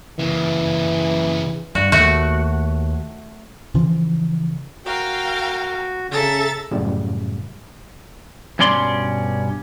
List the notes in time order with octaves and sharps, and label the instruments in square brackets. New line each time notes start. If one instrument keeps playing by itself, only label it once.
[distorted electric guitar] C#3 A#3 [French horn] E3
[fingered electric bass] G2 [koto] F#4
[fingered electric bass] D#2 [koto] A3 F#4
[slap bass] C#3 E3 F3
[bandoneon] F#4 [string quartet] A#4 F5 G5
[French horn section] C#3 [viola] A4 E5 [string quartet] A#5 A6
[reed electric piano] F#2 A2 C#3 G3
[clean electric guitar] G2 B2 C#4 D5 C6